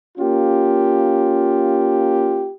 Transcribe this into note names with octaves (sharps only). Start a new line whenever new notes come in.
A#3 C#4 F4 G4